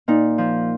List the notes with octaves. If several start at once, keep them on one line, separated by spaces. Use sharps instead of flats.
A#2 D#4
F3